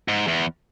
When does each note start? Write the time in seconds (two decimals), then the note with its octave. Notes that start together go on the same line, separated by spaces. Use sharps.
0.08 G#2
0.27 E2